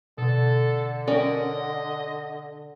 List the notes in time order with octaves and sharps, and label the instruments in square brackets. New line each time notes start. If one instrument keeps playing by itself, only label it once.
[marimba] B2 [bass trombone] D3 [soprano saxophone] A4
[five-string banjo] C#4 A#4 D5 [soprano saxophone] D#5